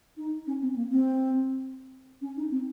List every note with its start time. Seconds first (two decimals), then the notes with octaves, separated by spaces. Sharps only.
0.17 D#4
0.47 C#4
0.62 C4
0.76 A#3
0.91 C4
2.21 C#4
2.37 D#4
2.51 C4